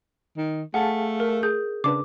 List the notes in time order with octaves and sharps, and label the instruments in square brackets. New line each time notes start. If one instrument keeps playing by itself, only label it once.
[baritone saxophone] D#3
[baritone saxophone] A3 [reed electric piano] G#4 F5 A5 [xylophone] F#5
[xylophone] A#4
G#4 G6
[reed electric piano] C#3 D4 B4 [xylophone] D6